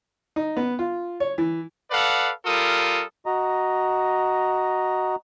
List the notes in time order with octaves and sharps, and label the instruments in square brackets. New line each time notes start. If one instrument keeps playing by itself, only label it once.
[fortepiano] D#4
B3
F4
C#5
E3
[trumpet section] A4 B4 D5 F5 F#5
G3 F4 A4 A#4 D#6
[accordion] F#4 D#5 A#5